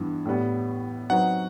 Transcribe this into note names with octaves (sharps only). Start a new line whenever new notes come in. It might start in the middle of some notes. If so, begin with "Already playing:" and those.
Already playing: G2 E3 B3
A2 G3 B3
F#3 C4 D#4 F#4 B4 F#5